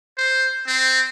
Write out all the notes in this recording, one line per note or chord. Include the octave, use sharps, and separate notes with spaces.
C5
C4